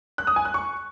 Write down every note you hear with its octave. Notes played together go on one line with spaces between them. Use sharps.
F#6
D#6
G#5
F#6
C#6